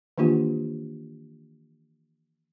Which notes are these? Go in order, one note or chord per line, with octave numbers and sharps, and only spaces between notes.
D#3 E3 A#3 D4 F4 G4